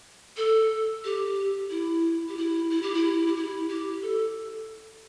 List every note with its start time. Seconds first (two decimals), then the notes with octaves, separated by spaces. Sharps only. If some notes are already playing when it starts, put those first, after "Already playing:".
0.37 A4
1.05 G4
1.70 E4
2.29 G4
2.37 E4
2.70 E4
2.83 G4
2.94 E4
3.27 G4
3.36 E4
3.69 G4
4.02 A4